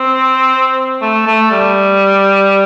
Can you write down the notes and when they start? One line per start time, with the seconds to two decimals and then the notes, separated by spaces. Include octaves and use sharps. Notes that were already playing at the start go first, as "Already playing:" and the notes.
Already playing: C4
1.02 A3
1.27 A3
1.51 G3